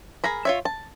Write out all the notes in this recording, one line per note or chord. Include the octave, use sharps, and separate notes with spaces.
G#4 A#4 A#5 B5
F4 C#5 E5
A5